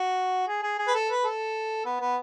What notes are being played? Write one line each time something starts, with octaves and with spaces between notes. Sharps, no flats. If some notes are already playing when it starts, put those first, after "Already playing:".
Already playing: F#4
G#4
G#4
G#4
B4
A4
B4
A4
B3
B3